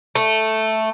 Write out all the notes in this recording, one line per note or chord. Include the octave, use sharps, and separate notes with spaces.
A3